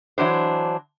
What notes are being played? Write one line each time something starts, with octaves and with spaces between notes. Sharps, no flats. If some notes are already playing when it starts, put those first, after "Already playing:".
E3 F#3 D4 C5